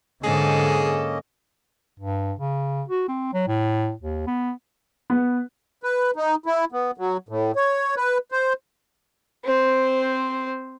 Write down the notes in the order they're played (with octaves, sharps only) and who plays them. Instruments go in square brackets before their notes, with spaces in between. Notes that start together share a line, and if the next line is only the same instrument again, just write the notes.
[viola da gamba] G#2 A4 [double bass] D3 [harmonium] A#3 C#4 D#5 [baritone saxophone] G#4
[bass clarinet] G2
C#3
F#4
C4
F#3
A2
D#2
B3
[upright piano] B3
[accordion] B4
D#4
E4
B3
F#3
A2
C#5
B4
C5
[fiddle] C4 C5